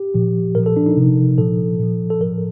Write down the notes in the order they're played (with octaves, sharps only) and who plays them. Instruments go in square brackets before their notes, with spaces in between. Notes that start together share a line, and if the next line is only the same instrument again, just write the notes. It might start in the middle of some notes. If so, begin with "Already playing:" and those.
Already playing: [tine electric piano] G4
A#2 F3
A#2 F3 A#4
A4
D4
D#4
C3 F3
A#2 F3 A4
A#2 F3
A4
A2 F3 A#4